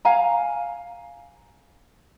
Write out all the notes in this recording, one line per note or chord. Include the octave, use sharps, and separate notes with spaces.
F5 G#5 A#5